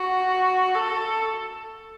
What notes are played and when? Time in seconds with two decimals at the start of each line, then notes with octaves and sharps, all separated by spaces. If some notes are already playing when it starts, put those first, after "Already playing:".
Already playing: F#4
0.75 A4